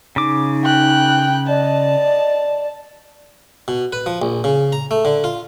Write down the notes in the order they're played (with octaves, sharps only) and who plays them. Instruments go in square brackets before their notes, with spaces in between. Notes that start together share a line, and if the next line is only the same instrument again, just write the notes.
[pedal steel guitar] C#3 D6 [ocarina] D#4
[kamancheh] G5 F#6
[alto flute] D5 [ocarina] D#5 [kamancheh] A5
[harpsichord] B2
B4
F3
A#1
C#3
A#5
A3
D3
F4